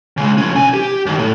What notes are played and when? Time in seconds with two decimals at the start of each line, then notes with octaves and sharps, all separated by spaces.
0.17 C#3 G#3
0.38 F3 C#4
0.55 B1 G#5
0.74 G4
1.06 F#2 D#3
1.19 A2